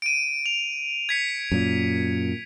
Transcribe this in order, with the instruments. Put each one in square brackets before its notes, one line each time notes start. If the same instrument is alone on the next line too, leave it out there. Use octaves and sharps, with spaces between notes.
[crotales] D7 D#7
F7
G#6 B6 C#7
[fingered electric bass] F#2 A#2